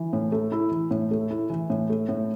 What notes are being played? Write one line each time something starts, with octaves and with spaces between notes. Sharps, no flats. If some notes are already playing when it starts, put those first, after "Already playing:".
Already playing: E3
A2
A3
E4
E3
A2
A3
E4
E3
A2
A3
A2